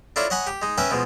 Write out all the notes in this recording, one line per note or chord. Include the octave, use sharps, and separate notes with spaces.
D4 E4 F4 A4 A#4 C#5
C#5 D#5 F#5 G#5 B5
G4
G#3 D#4
C#4 A#4 B4 E5 G5 G#5
B2 F3 G#3